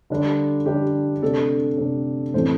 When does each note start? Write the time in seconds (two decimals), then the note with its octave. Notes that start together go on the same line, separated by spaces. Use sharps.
0.10 D3 G3 D4
0.66 D3 G3 D4 G4
1.22 C3 A3 D4 A4
1.78 C3 A3 D4
2.34 A2 E3 A3 C4 C5